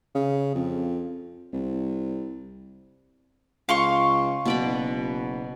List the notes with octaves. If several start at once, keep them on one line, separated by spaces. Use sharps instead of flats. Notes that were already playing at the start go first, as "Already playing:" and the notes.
C#3
F2
C2
C#2 F5 C6 C#6
F#1 B2 D5 B5